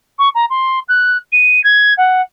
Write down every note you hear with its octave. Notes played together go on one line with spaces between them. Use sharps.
C#6
A#5
C6
F#6
D#7
G#6
F#5